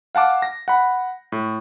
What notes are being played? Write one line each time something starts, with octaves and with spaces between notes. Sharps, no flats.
F5 F#5 A5 D6
A#6
F#5 B5
A2